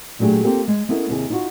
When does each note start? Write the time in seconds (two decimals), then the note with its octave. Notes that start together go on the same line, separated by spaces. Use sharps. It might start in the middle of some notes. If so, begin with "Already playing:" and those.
0.19 A#2 F#3 A3 D4 G4 G#4
0.44 A#3 C4 F4 G4 A4 A#4
0.68 G#3
0.89 B3 C#4 E4 A4 A#4
1.09 D#2 C3 G#4
1.30 D#4 F4 F#4